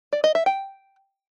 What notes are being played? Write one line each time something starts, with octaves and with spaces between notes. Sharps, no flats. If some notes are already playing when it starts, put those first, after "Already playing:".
D5
D#5
E5
G5